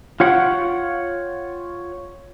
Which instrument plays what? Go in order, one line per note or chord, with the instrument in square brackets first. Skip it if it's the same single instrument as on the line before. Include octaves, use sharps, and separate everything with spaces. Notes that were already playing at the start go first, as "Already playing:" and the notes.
[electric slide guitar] F4 C#5 F#5 G5